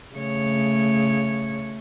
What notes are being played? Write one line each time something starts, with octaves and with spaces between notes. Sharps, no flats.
C#3 A3 C#5